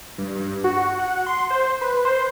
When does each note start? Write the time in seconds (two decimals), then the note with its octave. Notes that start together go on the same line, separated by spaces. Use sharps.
0.18 G2
0.35 G2
0.64 F#4
0.99 F#5
1.26 C6
1.51 C5
1.81 B4
2.05 C5